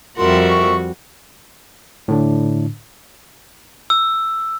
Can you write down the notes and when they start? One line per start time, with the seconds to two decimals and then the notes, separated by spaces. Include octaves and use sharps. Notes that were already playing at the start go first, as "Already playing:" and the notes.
0.18 F2 G3 F#4 A#4 E5 C6
0.49 C#6
2.08 A2 D3 D4
3.90 E6